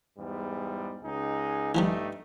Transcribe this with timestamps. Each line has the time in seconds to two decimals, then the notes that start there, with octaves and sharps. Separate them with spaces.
0.17 E2 G#2 G3
1.03 C#2 D#4 G#4
1.75 G2 E3 F3 G3 A3 D#4